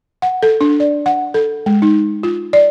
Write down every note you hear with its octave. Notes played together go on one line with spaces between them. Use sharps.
F#5
A4
D4
D5
F#5
A4
G#3
D#4
F4
D5